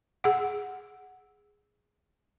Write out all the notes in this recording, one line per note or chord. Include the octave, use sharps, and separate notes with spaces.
G#4 F#5